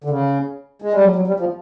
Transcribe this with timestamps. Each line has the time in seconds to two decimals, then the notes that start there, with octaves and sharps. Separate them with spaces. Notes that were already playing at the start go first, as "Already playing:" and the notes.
0.04 D3
0.10 C#3
0.82 G#3
0.93 G3
1.04 F#3
1.16 F#3
1.27 G3
1.40 F3